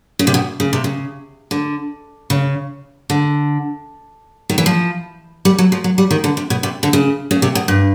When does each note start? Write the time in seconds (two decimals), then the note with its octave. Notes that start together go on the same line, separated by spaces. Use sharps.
0.19 C#3
0.27 C3
0.34 B2
0.60 C#3
0.73 C3
0.84 C#3
1.51 D3
2.30 C#3
3.10 D3
4.50 D#3
4.58 E3
4.66 F3
5.45 G3
5.58 F#3
5.72 F3
5.84 F#3
5.98 G3
6.11 D#3
6.24 D3
6.37 C3
6.50 B2
6.63 C3
6.83 D3
6.93 C#3
7.31 C#3
7.42 C3
7.55 B2
7.68 G2